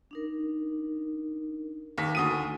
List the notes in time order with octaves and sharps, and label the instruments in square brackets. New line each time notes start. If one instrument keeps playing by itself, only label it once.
[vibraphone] D4 D#4 A#4
[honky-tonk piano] D#2 B6
[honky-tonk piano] D2 D#6 D#7 [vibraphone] F#4 G#5